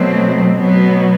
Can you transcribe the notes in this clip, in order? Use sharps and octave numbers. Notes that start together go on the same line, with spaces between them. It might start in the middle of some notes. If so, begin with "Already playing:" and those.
Already playing: B2 F#3 A3 C4
B2 F#3 B3